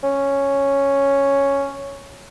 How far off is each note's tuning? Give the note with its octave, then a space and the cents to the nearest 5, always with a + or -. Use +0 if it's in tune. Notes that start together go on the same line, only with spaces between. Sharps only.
C#4 +0